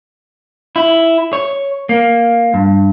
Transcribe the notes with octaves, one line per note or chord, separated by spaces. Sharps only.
E4
C#5
A#3
G2